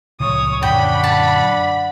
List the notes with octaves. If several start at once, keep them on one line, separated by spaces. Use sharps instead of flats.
C#2 A#2 F3 C#5 D#6
F#2 A#2 D3 D4 F#5 G5 B5
A5